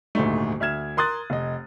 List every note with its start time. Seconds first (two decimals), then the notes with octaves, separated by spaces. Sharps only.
0.15 D#1 D2 G#2 A3
0.60 D2 E5 F6 G#6 E7
0.97 A#4 C6 D#6 F#6 A6
1.30 F1 D#5